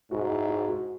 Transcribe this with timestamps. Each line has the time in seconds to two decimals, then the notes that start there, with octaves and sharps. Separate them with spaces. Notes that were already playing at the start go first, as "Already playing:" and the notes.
0.11 G#2 F#4
0.29 E4
0.49 F#4
0.68 F#4